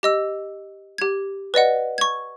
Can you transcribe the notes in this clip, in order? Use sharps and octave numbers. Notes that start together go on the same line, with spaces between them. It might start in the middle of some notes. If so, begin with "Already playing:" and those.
G4 D#5 E6
G4 G#6
B4 D5 D#5 F#5
C#6 G#6